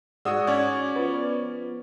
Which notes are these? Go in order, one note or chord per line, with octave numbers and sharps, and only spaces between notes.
G#2 F#4 G#4 D5 F#5 D#6 E6
C#4 C#5 D5 G#6
F3 B3